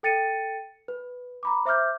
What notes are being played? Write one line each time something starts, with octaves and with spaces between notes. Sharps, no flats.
A4 G5 A6 C#7 D#7
B4
A#5 B5 D6
C5 E5 D6 F6 G6